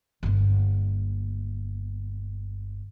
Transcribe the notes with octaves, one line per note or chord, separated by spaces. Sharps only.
G1 A#3